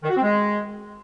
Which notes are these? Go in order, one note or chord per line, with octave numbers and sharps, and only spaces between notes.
D#3
F#4
C4
G#3